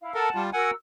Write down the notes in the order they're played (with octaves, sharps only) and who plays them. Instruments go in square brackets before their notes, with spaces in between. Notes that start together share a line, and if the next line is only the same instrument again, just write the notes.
[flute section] E4 F5
[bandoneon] A4 A#4 [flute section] F#5 A5
[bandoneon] G3 F4
[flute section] F#4 A#4 E6 [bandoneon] F#5 G#5